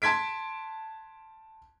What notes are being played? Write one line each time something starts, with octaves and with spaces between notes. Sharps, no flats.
A5 C6 G#6 B6 D7